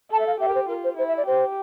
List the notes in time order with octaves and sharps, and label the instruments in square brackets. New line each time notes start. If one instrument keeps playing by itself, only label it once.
[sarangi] A4 [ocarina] A5
[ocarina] E5
F5
[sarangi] G4 [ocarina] E5
[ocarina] A#4
C5
[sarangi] F4 [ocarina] A#4
[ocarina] C5
[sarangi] E4 [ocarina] C5
[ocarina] E5
D5
[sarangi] G4 [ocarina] C5